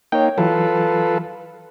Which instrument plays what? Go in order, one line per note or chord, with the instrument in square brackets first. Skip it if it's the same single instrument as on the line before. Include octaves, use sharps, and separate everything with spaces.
[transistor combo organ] A#3 D#4 [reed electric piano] C#5 G5
[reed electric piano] E3 F#3 [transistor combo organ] F4 A4 B4